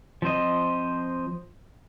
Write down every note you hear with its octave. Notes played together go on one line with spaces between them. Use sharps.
F3 C4 C5 D#5